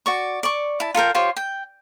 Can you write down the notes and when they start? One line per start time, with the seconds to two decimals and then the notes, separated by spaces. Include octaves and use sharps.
0.06 F#4 D5 C#6
0.43 D5 C#6
0.80 E4 A5
0.95 F4 A4 A#4 G5
1.15 F4 G4 C5 C#5
1.37 G5